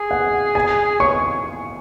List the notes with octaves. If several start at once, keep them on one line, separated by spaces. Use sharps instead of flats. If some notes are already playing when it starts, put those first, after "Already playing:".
Already playing: G#4
F#5
G#5
C#5 C#6